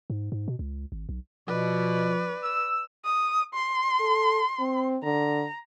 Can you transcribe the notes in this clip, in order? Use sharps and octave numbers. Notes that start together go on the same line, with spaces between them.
G#2
G#2
B2
C#2
G#1
B1
B2 F3 B4 D5
E6
D#6
C6
A4
C4
D3 A#5